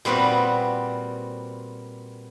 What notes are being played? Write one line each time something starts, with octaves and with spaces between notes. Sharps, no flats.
A#2 G3 B3 C4 F#4